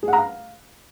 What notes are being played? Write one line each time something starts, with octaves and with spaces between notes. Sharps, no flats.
G#4
F#5
A#5
F5